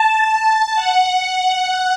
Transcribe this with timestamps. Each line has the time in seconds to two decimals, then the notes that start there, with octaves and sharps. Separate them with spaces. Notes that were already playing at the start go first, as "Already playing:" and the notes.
Already playing: A5
0.29 A5
0.75 F#5